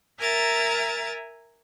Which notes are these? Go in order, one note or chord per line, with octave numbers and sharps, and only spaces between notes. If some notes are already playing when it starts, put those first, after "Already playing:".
A#4 E5 G#5 A#5 A6